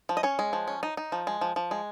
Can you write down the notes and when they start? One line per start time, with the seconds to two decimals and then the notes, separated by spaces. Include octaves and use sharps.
0.09 F3
0.17 D#5
0.23 C#4 C#5
0.39 G#3
0.53 F3
0.68 C#4
0.83 D#4
0.97 D#4
1.12 F3
1.27 G#3
1.41 F3
1.56 F3
1.71 G#3